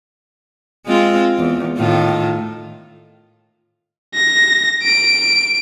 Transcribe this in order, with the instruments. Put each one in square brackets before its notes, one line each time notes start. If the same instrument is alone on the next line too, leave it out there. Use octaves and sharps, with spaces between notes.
[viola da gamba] G#3 C4 F4
E2
A2 D#3 F4
[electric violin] A#6
D7